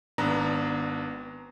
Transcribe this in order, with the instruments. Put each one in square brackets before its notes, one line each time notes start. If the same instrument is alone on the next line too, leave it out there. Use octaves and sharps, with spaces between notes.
[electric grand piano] G#1 B3 D4 A#5